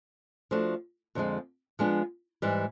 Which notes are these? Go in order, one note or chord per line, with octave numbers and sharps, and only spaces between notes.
F3 A3 D4 F#4
F2 D3 F3 G#3
F3 G#3 B3 D4
G#2 E3 G3